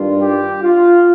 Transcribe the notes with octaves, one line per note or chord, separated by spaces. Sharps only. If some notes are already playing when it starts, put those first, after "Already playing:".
Already playing: G2 D#3 G3 D4 F4
G4
F4